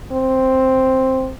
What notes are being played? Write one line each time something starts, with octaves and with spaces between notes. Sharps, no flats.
C4